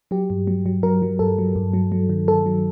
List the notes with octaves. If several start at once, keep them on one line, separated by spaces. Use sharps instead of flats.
F#3 G4
G2
F#3
F#3
F#3 A#4
F#3
G2 A4
F#3
G2
F#3
F#3
D#3
D#3 A4
F#3